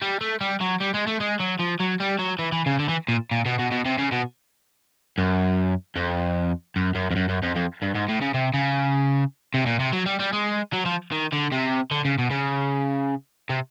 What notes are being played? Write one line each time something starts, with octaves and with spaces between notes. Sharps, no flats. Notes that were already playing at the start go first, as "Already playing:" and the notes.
G3
A3
G3
F#3
G3
G#3
A3
G#3
F#3
F3
F#3
G3
F#3
E3
E3
C#3
D3
E3
A#2
A#2
B2
B2
B2
C3
C#3
B2
F#2
F2
F#2
F#2
F2
F#2
F#2
F2
F2
G2
G#2
A2
C#3
C3
C#3
C3
A#2
C3
F#3
G3
G3
G#3
F#3
F3
D#3
D3
C3
D3
C#3
B2
C#3
C3